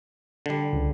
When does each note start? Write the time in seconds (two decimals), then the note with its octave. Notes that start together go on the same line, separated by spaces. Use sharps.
0.46 D3 G3
0.73 C#2